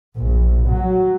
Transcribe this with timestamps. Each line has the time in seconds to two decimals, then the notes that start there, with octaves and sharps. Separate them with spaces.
0.17 A#1
0.69 F#3